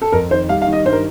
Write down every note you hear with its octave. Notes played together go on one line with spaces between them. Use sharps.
A4
F2 A#4
D#3 C5
G3 F5
F5
D#3
D#5
G2 C5
A#4